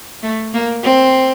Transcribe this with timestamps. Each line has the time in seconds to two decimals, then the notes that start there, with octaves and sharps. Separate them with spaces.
0.23 A3
0.53 A#3
0.83 C4